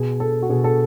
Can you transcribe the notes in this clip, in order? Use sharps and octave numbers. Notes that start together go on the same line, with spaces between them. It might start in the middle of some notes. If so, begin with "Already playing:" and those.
Already playing: B2 G#4
A4
F#4
B2 G#4
A4